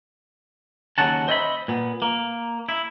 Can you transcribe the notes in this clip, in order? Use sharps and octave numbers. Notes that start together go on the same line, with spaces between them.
D#2 C#3 F#3 F#4 A5
C5 D#5 E5 G#5 B5
A#2 B3
A#3
E4